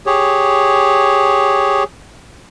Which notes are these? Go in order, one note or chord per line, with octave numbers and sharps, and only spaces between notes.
G4 G#4 C#5